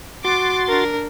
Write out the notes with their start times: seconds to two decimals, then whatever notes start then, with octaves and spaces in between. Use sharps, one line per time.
0.25 F#4 C6 D6 A6
0.68 D4 A#4